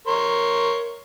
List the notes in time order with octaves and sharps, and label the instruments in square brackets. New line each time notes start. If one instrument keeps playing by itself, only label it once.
[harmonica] A#4 C#5 C6